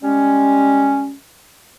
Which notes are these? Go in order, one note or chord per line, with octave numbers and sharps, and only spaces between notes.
G3 G#3 C#4